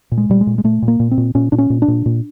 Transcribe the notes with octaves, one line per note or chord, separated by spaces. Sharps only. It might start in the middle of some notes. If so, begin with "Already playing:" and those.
A#2
G#3
A#2 G3
G#3
A#2
G#3
A#2 A3
A#2
A#3
A#2
C4
A#2
A#2 C#4
A#2 D4
C#4
A#2
D4
A#2
A#2